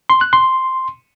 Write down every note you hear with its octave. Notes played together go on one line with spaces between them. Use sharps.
C6
F#6
C6